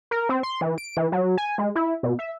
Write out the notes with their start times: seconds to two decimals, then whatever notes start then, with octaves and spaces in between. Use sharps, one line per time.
0.11 A#4
0.29 C4
0.43 C6
0.61 E3
0.78 D7
0.97 E3
1.12 F#3
1.38 G#5
1.58 G#3
1.76 E4
2.03 B2
2.19 E5